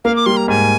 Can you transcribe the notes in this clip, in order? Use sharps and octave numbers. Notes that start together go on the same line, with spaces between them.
A#3 F5
D6
G3 C6
A#5
G#2 G#5